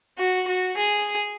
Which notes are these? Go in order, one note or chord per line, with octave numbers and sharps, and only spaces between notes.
F#4
F#4
G#4